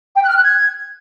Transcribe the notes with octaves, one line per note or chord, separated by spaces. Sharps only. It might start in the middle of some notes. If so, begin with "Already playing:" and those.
G5
F#6
F6
F#6
G#6